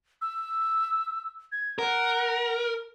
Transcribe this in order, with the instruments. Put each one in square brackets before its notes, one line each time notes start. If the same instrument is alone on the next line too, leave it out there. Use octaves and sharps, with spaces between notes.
[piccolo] E6
G#6
[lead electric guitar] A#4 [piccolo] F#5